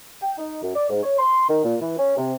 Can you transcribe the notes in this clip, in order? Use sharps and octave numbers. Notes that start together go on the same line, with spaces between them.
G5
D#4
F#2
D5
G#2
C#5
C6
D#3
A#2
E3
C#4
C3